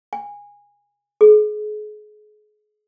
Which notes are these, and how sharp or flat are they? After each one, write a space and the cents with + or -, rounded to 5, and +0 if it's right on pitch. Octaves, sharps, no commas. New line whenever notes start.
G#5 -20
G#4 +35